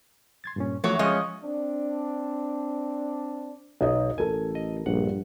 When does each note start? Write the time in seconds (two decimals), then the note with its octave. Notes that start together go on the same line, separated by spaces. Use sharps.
0.44 C6 G#6 A6
0.56 G2 A#2 C#4
0.84 E2 F3 F#3 A3 C#5
0.99 F3 G#3 C#4 D#5 F#6
1.44 C4 D4
3.81 B1 D#4 D#5
4.18 A1 A4 A#4 G#5
4.55 D#5
4.86 A#1 G2 F#5